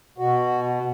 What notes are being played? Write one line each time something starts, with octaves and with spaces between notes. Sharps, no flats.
B2 F#4